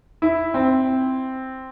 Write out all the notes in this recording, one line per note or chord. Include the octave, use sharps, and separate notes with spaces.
E4
C4